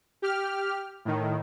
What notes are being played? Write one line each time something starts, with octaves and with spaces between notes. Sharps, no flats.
G4 F6
A2 D#3